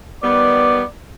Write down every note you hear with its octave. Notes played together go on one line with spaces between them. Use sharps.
D#3 G3 B3 D5